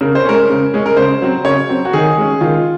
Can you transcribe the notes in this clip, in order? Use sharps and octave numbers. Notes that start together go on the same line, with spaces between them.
C#3 A#4
C5
G#3 C#4 A#4
C#3
G#3 C#4
A#4
C#3 C5
F#3 C4
C#3 C#5
F#3 C4
F#4
D#3 G#4
G#3 C#4
D#3 F4